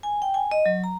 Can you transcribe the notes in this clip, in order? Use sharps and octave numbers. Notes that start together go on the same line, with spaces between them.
G#5
G5
G#5
D#5
F#3
A#5